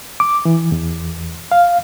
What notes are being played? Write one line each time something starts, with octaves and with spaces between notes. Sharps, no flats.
D6
E3
E2
F5